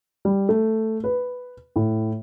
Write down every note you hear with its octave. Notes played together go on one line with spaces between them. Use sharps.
G3
A3
B4
A2